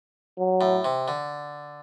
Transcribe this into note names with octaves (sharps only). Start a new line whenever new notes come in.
F#3
A2
C3
D3